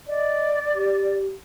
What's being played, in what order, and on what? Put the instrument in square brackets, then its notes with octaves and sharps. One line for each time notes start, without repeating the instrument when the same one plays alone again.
[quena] D5 [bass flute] D#5
[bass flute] G4